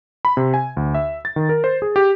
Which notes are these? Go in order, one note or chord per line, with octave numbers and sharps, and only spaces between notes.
B5
C3
G#5
D2
E5
A6
D#3
A#4
C5
G#4
G4